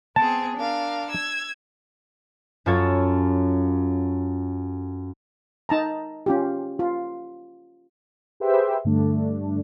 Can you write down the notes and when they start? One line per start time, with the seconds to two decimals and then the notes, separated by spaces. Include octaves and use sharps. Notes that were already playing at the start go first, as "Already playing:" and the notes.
0.16 B3 C4 G#4 A5
0.56 D4 A#4 F5
1.10 E6 G#6
2.66 F#2 F4 A4 C#5 G#6 C#7
5.69 D#4 A5 A#5
6.26 C#4 F4 G4
6.79 F4
8.40 G4 G#4 B4 C5 E5 G5
8.84 G2 D3 A3 D4